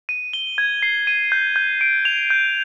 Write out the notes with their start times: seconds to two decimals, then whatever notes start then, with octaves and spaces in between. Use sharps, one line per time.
0.09 D#7
0.33 G7
0.58 G#6
0.83 C7
1.07 D#7
1.32 G6
1.56 G6
1.81 D7
2.05 F7
2.30 G6